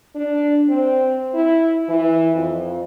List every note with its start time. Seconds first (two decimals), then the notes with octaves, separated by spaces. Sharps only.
0.15 D4
0.69 C4
1.34 E4
1.88 E3
2.34 F2